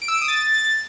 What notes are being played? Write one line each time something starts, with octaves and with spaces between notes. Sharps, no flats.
D7
E6
D7
D#6
A6